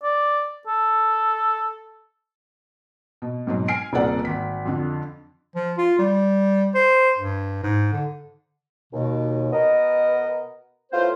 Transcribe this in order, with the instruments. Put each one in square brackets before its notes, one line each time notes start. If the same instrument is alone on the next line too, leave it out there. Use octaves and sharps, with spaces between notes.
[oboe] D5
A4
[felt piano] B2
G#2 B2 F#3
G#5 F6 C7 D7
D#1 C3 G#4 B4 D5 F#5
G#1 B6
F2 D3
[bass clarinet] F3
F4
G3
C5
G2
G#2
D3
[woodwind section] D#2 B2
B2 B3 A#4 D#5
A2 B3 F4 C5